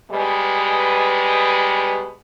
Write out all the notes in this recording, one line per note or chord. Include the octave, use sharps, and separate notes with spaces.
B2 G3 G#3 B4